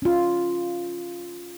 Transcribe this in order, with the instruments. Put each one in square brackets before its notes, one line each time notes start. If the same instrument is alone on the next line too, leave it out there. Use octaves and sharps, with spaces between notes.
[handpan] C#4 F4